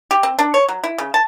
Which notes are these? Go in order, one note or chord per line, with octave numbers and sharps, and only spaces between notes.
G4
C4
D4
C#5
F#3
E4
C#3
A5